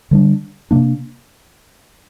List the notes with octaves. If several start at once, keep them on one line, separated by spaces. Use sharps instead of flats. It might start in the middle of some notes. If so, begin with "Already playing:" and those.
D3 G3 D4
C3 A#3 D4